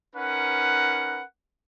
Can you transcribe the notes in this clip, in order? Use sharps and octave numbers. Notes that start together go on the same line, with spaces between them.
C#4 D#4 A#4 B4 F#5